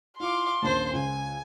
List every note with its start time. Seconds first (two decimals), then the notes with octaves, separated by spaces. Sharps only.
0.20 E4 F4 F5 C6 D6
0.62 D#1 A#1 D#2 C5 A5
0.93 C#2 G#5